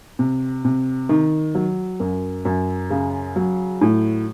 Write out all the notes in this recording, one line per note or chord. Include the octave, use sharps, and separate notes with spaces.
C3
C3
D#3
F#3
F#2
F#2
C#3
F#3
A2